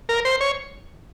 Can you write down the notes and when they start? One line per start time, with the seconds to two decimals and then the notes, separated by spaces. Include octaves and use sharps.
0.09 A#4
0.25 C5
0.41 C#5